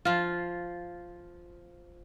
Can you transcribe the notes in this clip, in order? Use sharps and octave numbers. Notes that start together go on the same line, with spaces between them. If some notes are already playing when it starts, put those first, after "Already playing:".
F3 F4